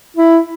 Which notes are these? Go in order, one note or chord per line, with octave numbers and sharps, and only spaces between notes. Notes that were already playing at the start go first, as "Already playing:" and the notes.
E4